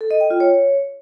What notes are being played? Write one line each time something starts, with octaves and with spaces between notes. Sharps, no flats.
A4
D#5
G5
F4
C#5